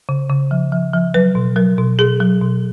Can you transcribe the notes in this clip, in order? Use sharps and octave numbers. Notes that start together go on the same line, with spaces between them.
C#3
C#3
F3
F3
F3
F#3 B4
B2
F#3 A#4
B2
B2 G#4
F#3
B2